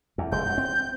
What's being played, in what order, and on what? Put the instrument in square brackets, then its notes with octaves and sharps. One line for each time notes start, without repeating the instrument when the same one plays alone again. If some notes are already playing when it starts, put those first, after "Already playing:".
[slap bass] E2
[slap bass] F1 G#3 [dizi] G6
[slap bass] F#2
C4